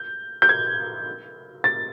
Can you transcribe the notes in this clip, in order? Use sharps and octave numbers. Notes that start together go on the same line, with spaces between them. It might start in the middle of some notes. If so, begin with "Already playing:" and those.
Already playing: G6
G6
G#6
A6